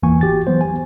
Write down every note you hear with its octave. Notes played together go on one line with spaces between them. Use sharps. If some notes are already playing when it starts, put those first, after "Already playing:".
G1 E2 E3 A#3 G#5 C#6
F#4 G4 A6
E3 F#3 B3 C5
G#5